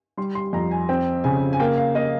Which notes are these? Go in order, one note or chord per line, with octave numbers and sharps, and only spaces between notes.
G3 C6
C6
F2 A#5
G#5
C4 G5
C#3 G#5
G#5
A#3 G5
F5
A#3 D#5